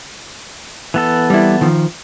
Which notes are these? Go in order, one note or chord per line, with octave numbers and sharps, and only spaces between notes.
E3 B3 A4
G3 E4
D#3 F3